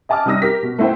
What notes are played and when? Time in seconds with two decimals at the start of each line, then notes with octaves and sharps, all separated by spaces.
0.09 D#5 G#5 A5 D6 D#6 F6
0.26 C3 G3 D#4 D#6 E6 A#6
0.42 G4 A#4 B6
0.63 B2
0.79 A3 B3 E4 C5 G5